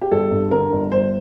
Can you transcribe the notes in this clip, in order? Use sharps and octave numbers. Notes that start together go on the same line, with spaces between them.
G4
G1 A4
G2
D3 A#4
G1
G1 C5